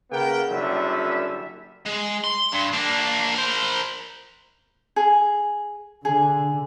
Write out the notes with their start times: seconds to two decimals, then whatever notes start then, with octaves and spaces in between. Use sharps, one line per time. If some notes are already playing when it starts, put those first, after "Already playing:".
0.11 C#3 A#3 B3 A#4 G5
0.50 F#1 F#2 D3 G3 E5
1.86 G#3
2.24 C6
2.53 G2
2.73 A#3 D4
3.35 A#4 C5
4.96 G#4
6.05 D3 G#4